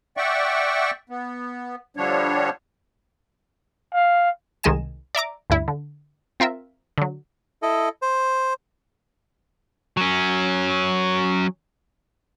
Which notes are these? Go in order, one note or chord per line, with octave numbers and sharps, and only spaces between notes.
D5 E5 F#5 G5 C#6
B3
D3 F3 G3 D4 C#5
F5
C2 D#3 G#3 D#5 G#5 E7
D5 E5 A#5 D6
D2 G2 E4
D3
C4 F4 A#4 E5
D3 F#3
E4 A4 D#5
C5
F#3 C#4